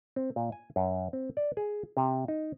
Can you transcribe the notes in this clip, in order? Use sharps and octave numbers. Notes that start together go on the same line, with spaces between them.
C4
A#2
G#5
F#2
C4
D5
G#4
C3
D#4